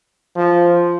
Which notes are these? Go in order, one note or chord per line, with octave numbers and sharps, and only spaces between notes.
F3